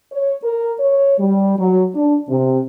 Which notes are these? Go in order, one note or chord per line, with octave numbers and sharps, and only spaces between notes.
C#5
A#4
C#5
G3
F#3
D4
C3